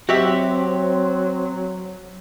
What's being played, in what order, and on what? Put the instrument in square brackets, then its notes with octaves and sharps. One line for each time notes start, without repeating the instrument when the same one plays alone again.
[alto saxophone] F#3 [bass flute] C4 [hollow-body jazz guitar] F#4 G4 E5